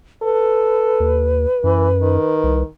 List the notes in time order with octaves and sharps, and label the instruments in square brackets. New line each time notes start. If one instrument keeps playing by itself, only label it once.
[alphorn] A4 [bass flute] B4
[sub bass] D#2
[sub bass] F#2 [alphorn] E3
[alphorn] D#3
[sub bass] C2